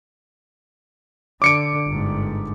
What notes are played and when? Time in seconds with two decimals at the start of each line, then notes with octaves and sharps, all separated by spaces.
1.42 D3 D6 C#7 D7
1.87 G1 G#2